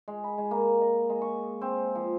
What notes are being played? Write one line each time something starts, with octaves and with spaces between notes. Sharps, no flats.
G#3
B5
G#3
A#3
D#5
G#3
C#6
C4
F3